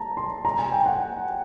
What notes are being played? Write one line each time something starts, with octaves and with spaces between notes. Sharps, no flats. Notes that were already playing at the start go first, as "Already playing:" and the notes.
Already playing: A5 A#5
C6
A#5
G#5
G5
F#5